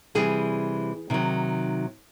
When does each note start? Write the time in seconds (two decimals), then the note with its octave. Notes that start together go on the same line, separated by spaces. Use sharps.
0.15 C3 E3 G3 G#4
1.10 C3 D#3 F#3